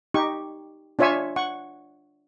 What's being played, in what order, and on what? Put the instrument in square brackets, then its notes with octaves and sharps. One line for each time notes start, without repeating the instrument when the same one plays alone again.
[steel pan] D#4 G4 C#6
D4 F4 C#5 E5 G#5 C#6
F#5 C#6